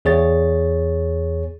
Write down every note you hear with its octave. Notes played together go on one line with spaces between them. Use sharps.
E2 G#4 C#5 A6